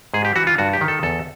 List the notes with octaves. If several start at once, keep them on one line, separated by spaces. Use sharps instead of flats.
G#2 G#4
G4
E3 F#4
F4
G2 F#4
G4
D#3
A4
E2 A4